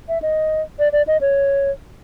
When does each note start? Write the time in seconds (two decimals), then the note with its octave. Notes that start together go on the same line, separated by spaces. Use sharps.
0.09 E5
0.22 D#5
0.79 D5
0.93 D5
1.07 D#5
1.21 C#5